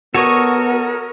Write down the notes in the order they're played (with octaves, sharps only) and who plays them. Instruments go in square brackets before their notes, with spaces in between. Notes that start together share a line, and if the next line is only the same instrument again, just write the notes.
[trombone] B3 [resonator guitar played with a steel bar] F#4 [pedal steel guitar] A4 C#5 D#5 [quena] A#4